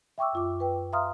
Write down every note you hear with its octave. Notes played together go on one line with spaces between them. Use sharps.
E5 G5 C#6 D6 E6
F#2 F4 D6
B4 G5
E5 F5 A#5 C6 D#6 F6